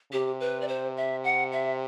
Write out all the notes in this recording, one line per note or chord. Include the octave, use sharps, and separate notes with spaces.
C3 G4
B4
D5
C5
E5
F#5
E5